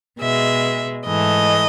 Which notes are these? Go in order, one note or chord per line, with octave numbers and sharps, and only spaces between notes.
B2 G#3 E5
G#2 E3 A3 D#5